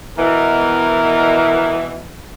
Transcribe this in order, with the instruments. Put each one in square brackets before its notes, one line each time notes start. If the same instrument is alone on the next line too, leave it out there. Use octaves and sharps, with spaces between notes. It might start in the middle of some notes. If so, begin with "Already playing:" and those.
[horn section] B2 E3 [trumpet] A#4